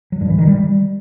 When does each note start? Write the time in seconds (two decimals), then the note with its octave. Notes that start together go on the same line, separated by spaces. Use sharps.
0.12 F#3
0.21 G2
0.30 E3
0.39 D#3
0.47 G3